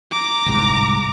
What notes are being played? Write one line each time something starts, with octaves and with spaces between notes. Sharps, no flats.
A#5 D6
G1 C2 G#2